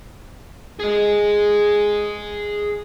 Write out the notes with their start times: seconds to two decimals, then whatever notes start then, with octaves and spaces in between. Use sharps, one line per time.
0.80 G#4 D#5